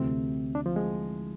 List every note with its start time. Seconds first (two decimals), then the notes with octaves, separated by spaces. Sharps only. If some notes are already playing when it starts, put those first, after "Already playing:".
Already playing: D2 C3 E3 A3 C4
0.55 D4
0.66 F3
0.76 G#3